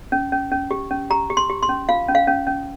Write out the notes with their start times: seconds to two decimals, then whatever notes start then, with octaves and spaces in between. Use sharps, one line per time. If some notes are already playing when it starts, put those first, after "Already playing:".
0.12 C#4
0.32 C#4
0.51 C#4
0.71 G4
0.91 C#4
1.10 G4 A#5
1.30 G4
1.37 C6
1.49 G4
1.62 C6
1.69 C#4
1.89 F4 F5
2.08 C#4
2.15 F5
2.27 C#4
2.47 C#4